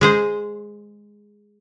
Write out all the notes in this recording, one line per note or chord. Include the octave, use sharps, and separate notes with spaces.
G#3 G#4 C5